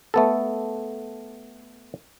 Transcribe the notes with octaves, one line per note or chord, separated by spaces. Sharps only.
A3 B3 A4